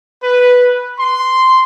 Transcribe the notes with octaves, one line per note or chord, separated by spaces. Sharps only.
B4
C6